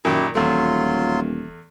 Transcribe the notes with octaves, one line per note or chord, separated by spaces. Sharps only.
F#2 A#2 D#3 E4 G4
D#1 E2 F#3 A3 F4 C6